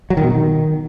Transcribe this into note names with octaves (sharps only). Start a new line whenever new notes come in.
F#3
D#3
B2
D#3